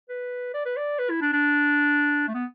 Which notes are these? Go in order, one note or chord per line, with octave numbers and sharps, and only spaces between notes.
B4
D5
B4
D5
B4
E4
D4
D4
A3
B3